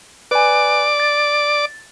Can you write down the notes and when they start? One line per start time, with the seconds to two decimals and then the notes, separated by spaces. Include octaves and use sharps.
0.31 B4 D5 G#5 D6
1.00 A6